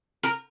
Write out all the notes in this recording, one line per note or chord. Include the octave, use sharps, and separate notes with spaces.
A#4